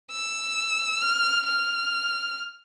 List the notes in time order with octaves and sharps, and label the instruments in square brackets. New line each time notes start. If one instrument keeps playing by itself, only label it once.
[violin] E6
F6
F6